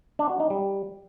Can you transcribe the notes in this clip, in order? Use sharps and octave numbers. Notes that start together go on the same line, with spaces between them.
D4
F#4
D#4
G3